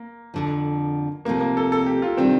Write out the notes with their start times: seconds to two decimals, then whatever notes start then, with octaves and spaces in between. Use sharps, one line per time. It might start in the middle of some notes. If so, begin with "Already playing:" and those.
Already playing: A#3
0.34 F2 D3 F3
1.25 C3 F3 A3 A#3 C4
1.41 A#3
1.57 A4
1.72 A4
1.86 G4
2.02 F4
2.17 C3 D#3 G3 C4 D4